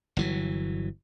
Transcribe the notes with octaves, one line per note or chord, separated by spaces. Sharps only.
G1 E3 F#3